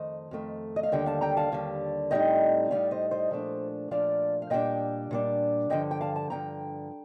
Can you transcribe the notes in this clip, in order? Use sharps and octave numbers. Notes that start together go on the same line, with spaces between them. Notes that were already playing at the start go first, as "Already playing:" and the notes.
Already playing: F2 D#3 A3 C5 D#5
F2 D#3 A3
D#5
F5
D#2 D3 G3 D#5 G5
F5 A5
G5 A#5
F5 A5
D#2 D3 G3
A2 G3 C4 D#4 D#5 G5
A2 G3 C4 D#4 D5 F5
C5 D#5
C5 D#5
A#2 F3 A3 D4
A#2 F3 A3 D4 D5 F5
F5
A#2 G3 D4 D#5 G5
A#2 G3 D4
G2 D3 F3 D#5 G5
G5
F5 A5
F5 A5
G2 D3 F3 G5 A#5